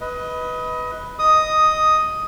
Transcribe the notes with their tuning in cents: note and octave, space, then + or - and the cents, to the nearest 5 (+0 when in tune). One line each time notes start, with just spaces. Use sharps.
B4 +0 D#5 +25
D#5 +0 D#6 +5